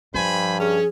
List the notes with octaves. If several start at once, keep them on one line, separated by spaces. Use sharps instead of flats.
G2 F3 C5 G#5 B5
C#4 G#4